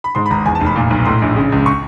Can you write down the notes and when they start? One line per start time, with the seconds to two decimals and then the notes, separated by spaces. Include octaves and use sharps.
0.04 B5
0.15 G#2 C6
0.26 B5
0.30 G#1 A#5
0.45 E2 G#5
0.55 A5
0.61 F1
0.66 B5
0.76 A#2
0.90 B1
1.05 A2 C6
1.22 A#1
1.36 C#3
1.52 C#2
1.66 C#6